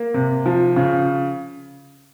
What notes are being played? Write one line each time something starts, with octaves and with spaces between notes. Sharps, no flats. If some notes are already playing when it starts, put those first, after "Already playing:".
Already playing: A#3
C3
F3
C#3